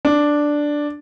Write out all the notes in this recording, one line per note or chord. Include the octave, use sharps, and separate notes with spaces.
D4